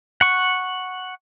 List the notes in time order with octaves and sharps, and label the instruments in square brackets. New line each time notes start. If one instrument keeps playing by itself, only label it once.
[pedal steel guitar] F#5 C#6